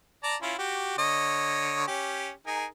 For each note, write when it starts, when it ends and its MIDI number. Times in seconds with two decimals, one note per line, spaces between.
0.23 0.36 74
0.23 0.36 81
0.23 0.36 82
0.42 0.54 61
0.42 0.54 64
0.42 0.54 65
0.58 0.94 66
0.58 0.94 67
0.98 1.84 50
0.98 1.84 73
0.98 1.84 75
1.88 2.31 61
1.88 2.31 67
2.47 2.65 63
2.47 2.65 68
2.47 2.65 70